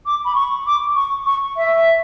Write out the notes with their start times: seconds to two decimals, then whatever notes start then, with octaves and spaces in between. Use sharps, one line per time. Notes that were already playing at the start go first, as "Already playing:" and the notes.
0.06 D6
0.25 B5
0.35 C#6
0.66 D6
0.96 C#6
1.26 C#6
1.57 E5